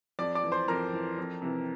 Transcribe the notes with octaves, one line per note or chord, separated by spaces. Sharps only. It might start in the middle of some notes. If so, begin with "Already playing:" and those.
F2 D5 D6
D5 D6
E3
C5 C6
F2 A#4 A#5
E3
F2
C3 E3